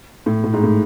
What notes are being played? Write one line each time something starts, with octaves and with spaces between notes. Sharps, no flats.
A2
A2
G#2
A2